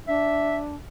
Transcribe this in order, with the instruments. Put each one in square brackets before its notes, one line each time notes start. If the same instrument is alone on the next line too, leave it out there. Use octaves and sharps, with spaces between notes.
[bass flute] D4 [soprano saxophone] E5